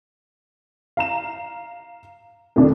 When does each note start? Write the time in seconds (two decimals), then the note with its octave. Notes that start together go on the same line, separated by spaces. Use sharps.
0.97 F5 A#5 E7
2.56 F2 C3 D#3 A3 D4